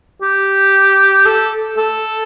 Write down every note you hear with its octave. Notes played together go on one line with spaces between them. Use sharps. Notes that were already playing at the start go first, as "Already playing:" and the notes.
G4
A4
A4